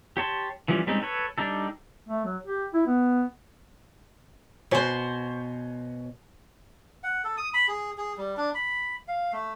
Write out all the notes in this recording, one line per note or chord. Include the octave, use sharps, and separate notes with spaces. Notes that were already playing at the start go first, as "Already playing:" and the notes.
G4 C#5 A5 C6
E3 F3 G3 C#4
G3 G#3 C4 C#4 D#4
A4 B4 C#5
G3 D4 D#4 A4
A3
F#3
G4
E4
B3
B2 F#4 C5 C#5 G#5
F#5
A4
D#6
B5
G#4
G#4
G3
D4
B5
F5
A3